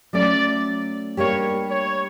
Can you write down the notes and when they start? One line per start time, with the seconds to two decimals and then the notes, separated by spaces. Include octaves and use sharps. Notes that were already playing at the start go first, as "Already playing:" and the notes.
0.13 F#3 A3 C#4 D5
1.17 G3 A#3 D4 G4 C#5
1.69 C#5